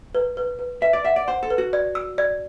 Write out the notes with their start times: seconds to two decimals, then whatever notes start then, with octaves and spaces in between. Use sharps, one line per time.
0.15 B4
0.37 B4
0.59 B4
0.82 B4 E5
0.93 D5
1.04 E5 F#5
1.16 D5
1.27 C5 F#5
1.43 A4
1.50 B4
1.58 F#4
1.73 D5
1.95 E6
2.18 D5